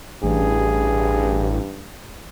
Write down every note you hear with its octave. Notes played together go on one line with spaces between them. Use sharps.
A1 G2 G#4